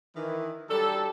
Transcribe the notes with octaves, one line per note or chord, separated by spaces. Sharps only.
D#3 E3
F#3 G3 D4 A4